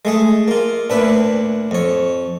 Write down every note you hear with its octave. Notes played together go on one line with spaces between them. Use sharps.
G#3 A3 G#4
A#3 F4
D2 A#2 D4 B4 E5
F2 C#5